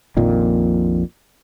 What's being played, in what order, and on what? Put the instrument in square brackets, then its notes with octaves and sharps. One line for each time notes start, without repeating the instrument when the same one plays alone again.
[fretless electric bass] A#1 F2 A#2 D#3